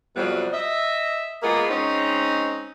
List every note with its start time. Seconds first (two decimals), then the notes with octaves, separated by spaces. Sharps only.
0.16 F2 C3 F#3 G3 B3
0.53 D#5 E5
1.43 G#3 A#3 B3 F4 G#4
1.69 G#3 C4 C#4 D#4